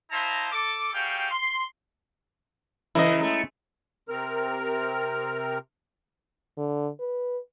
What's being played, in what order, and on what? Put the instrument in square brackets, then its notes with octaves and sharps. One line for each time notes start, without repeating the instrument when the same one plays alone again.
[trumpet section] E4 C5 D#5 F5 A5 A#5
A4 D6
G3 F#4 G#4 F5 G5
C6
[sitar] C#3 E3 A#4 [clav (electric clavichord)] E4 D#5
[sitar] G#3 A3
[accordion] C3 C4 A#4 F6
[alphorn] D3
B4